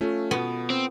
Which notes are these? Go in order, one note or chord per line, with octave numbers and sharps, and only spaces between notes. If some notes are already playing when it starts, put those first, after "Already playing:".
A3 C#4 F4 A4
B2 B3
C4